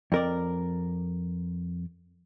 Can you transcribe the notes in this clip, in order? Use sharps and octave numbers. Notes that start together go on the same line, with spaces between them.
F2 A#4 D5